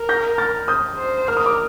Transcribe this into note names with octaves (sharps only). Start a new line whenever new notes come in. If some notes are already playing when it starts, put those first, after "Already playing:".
Already playing: A#4
G6 A#6
F6 A6
D#6 G6
C5
A#4 F6
D#6
D6